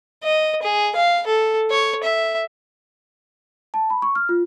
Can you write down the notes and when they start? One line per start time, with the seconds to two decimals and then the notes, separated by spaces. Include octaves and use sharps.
0.23 D#5
0.63 G#4
0.96 F5
1.27 A4
1.71 C#5
2.03 E5
3.74 A5
3.90 B5
4.02 C#6
4.15 F6
4.29 F4